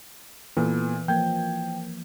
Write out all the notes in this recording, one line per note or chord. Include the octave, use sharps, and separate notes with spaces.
A#2 E3 B3 A4
F3 A#3 G5 G6 G#6